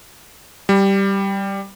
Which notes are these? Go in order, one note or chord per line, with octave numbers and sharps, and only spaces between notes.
G3